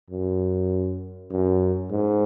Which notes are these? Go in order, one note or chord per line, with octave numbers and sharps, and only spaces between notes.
F#2
F#2
G#2